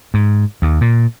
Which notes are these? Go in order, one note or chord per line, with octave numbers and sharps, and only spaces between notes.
G#2
D#2
A#2